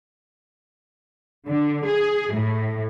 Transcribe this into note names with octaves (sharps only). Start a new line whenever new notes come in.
D3
G#4
A2